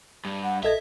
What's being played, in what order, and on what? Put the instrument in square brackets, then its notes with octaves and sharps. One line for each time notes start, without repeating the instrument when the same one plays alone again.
[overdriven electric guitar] G2
[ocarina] F#5
[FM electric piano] A#1 A4 G#6 [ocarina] D#5 [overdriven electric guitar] E5